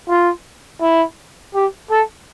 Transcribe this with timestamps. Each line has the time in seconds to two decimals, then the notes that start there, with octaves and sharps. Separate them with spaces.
0.09 F4
0.81 E4
1.55 G4
1.91 A4